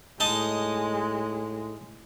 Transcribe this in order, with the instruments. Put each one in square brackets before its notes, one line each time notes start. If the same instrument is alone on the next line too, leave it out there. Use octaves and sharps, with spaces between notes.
[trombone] A2 [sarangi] G#3 [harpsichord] D#4 D#5 A5